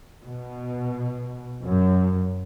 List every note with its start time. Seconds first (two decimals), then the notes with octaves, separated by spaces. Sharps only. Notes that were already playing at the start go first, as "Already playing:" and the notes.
0.23 B2
1.65 F#2